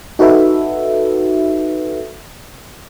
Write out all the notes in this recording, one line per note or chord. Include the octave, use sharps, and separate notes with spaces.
D#4 F#4 A4 B4 E5